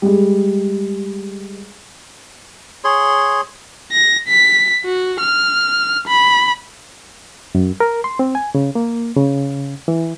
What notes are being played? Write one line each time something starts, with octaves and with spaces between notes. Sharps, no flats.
G3 G#3
G#4 C#5 C6
A#6
B6
F#4
F6
B5
F#2
A#4
C6
C4
G#5
C#3
A#3
C#3
E3